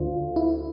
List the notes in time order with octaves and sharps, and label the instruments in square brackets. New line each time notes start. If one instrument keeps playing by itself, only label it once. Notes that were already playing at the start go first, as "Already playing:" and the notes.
Already playing: [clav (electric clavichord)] D2 D3 [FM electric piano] F4
[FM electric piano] E4